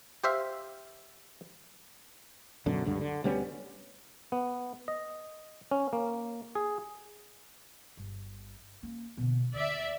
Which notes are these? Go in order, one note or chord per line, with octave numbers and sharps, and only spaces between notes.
G4 C5 E5 F5
F#2 B2 D3
C#2 G2 D3
D3
D2 G3 B3 C#4
B3
D#5
C#4
A#3
G#4
G1
A#3 C#4
B2 D3
D#2 D3 D5 E5